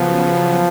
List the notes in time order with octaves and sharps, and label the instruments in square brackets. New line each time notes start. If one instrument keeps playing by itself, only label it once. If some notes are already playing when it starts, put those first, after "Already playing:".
Already playing: [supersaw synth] C#3 F#3 B3 [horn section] F3